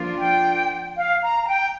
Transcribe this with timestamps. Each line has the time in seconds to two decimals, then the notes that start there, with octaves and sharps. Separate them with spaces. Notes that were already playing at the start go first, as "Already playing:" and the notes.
Already playing: F3 A#3 D4 F4
0.19 G5
0.97 F5
1.22 A#5
1.43 A#5
1.48 G5